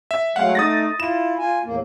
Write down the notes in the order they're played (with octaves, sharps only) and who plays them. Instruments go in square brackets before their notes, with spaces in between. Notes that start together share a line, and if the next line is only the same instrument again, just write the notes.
[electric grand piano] E5
[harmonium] F#3 G#3 A3 [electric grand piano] F5 F#5
[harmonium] A3 D#4 [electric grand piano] D#6 A6 A#6
[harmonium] E4 F4 [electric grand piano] E7
[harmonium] F4 G#5
E2 A2 A#3